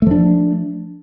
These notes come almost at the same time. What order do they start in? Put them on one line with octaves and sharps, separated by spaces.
A3 F3 D4